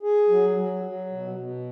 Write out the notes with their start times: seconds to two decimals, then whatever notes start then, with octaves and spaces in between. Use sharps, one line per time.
0.03 G#4
0.29 F#3
0.57 F#3
0.84 F#3
1.12 B2
1.39 B2